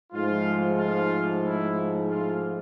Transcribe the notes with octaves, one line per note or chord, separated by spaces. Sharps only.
G#2 F3 A3 F4
F4
E4
F4